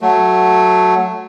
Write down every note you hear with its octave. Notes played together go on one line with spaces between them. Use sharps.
F#3 A3